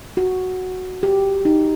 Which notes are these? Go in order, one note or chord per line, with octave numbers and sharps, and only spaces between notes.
F#4
G4
D#4